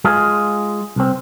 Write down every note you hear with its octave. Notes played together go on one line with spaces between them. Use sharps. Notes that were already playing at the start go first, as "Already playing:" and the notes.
G#3 F4 G#4
C2 C4